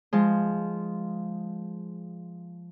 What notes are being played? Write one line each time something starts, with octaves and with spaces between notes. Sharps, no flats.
F3 G#3